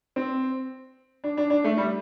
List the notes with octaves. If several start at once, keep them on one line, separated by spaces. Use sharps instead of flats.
C4
D4
D4
D4
A3
G3